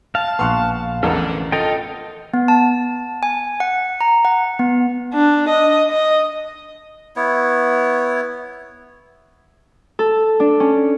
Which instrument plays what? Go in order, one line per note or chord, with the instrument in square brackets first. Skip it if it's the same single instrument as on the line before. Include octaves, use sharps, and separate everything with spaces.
[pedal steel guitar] F5 [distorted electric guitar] A5
[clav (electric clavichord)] A#1 B3 [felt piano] C6 C#6 F#6
[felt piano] A1 [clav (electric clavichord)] B3 A#4 A5 [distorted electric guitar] D4 A4
[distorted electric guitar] F4 [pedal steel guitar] A4 D#5 G5
[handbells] B3
A5
G#5
F#5
A#5
F#5
B3
[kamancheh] D4
D#5
D#5
[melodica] B3 E4 C#5
[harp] A4
D4
C#4